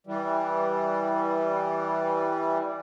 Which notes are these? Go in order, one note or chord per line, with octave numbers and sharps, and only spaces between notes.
E3 G3